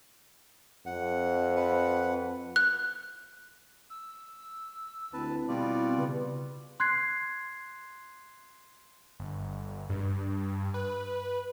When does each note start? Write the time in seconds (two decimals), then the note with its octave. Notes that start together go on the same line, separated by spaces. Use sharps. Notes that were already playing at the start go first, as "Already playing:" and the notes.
0.86 F2 F#5
1.56 B4 F#5
2.56 F#6
3.90 E6
5.13 D2 C4 E4 B4 A5
5.48 B2 G3 F4 D5
5.98 C#3 B4
6.80 C6 F#6 G#6 C7
9.20 G1
9.90 G2
10.74 B4